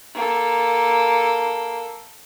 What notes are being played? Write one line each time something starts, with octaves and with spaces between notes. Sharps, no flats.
A#3 A4